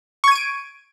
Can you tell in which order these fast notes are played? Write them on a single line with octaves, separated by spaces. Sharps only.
C#6 G#6 D#7 D7